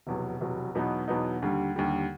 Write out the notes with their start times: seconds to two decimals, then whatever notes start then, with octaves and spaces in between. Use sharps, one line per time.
0.07 F1 E2 B2 F#3
0.41 F1 E2 B2 F#3
0.75 E2 B2 F#3 B3 D#4
1.08 E2 B2 F#3 B3 D#4
1.42 D#2 D3 G3
1.76 D#2 D3 G3